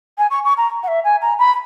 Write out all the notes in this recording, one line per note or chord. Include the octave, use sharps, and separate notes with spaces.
G#5
C#6
C#6
A#5
F#5
E5
G#5
A#5
B5